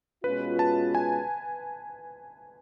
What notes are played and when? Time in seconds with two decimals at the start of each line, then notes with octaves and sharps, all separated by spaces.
0.24 B2 G#3 C#4 F4 B4
0.59 A5
0.95 G#5